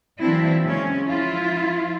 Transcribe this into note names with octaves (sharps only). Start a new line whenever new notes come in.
E3 F#3 A#3 C4 D4 E4
C#3 G#3 C#4
F3 E4 F4